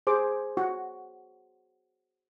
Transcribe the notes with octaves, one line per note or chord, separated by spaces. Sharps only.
G#4 C5 D6
F#4